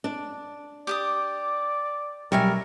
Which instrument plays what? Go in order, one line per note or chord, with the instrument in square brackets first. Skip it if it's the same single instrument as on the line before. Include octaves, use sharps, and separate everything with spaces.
[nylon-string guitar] D4
[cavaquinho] G4 D6 D#6 [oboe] D5
[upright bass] B1 [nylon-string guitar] G3 [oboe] A#4 [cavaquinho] C#5 E5 G#5